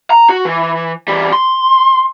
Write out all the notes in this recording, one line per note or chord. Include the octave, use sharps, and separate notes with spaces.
A#5
F#4
E3
E3 G3
C6